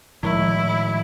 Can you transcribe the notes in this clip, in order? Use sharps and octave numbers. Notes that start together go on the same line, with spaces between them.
A2 D#3 F3 G#3 E4